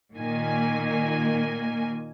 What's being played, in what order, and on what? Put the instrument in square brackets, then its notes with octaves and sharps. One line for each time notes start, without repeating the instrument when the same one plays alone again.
[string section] A#2 D#3 A#3 G#5